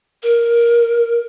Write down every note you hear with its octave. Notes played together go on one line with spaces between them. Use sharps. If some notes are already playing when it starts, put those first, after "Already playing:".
A#4